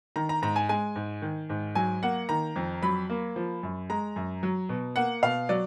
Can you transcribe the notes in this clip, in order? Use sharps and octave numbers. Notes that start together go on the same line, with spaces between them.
D#3 A#5
A#5
G#2 A#5
G#5
G#3 G#5
G#2
D#3
G#2
F#3 G#5
A#3 F#5
D#3 A#5
F2
F#3 B5
A#3
F3
F#2
G#3 A#5
F#2
F#3
B2
A#3 F#5
B2 F5
F#3 D5